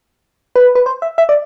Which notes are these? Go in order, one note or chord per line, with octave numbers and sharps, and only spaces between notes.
B4
B4
C5
E5
E5
D5